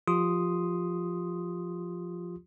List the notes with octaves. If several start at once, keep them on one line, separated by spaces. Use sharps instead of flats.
F3 F4 G4 C6 D#6